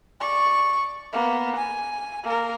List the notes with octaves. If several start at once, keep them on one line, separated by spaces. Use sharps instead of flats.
D5 C#6
A#3 B3
G#5
A#3 A#4